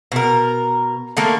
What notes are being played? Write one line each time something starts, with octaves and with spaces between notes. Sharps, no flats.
B2 A#4
D3 A3 A#3